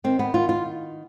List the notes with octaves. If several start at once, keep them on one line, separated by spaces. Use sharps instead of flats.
D#3 C4
B3
D#3 F4
F4